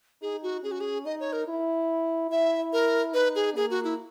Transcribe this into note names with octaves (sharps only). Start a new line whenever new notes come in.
D#4 G#4
F#4
C#4 G#4
F#4
G#4
D#4 D#5
C#5
A#4
E4
E4 E5
A#4
D#4 B4
G#4
A#3 G#4
F#4
E4